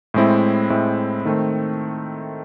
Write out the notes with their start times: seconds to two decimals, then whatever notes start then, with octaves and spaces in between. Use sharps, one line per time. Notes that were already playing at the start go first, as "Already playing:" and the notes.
0.14 A2 G#3 C4 E4
0.70 A2 G#3 C4 E4
1.25 D#3 A3 C4